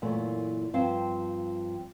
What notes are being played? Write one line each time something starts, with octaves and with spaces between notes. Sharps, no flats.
F#2 A#2 E3 A3
G2 F3 C4 F5 A5